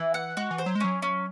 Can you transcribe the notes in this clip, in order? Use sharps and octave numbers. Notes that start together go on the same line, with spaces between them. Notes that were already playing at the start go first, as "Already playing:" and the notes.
Already playing: E3 E4
F#5
G#3 F#4
E3
C5
F#3
G#3
F#3 C#4
C#4